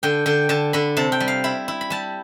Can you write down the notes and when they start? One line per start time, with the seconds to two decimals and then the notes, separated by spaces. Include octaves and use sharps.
0.03 D3 G5
0.26 D3 G5
0.49 D3 A5
0.73 D3 B5
0.97 C3 A5
1.12 G5
1.20 G3
1.28 F5
1.44 E4 B5
1.68 E4
1.81 B5
1.90 G3 A5